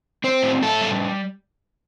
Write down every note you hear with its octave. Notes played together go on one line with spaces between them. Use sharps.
C4 C5
A2
A2 A4
G3